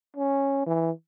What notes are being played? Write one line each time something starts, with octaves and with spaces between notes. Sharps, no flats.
C#4
E3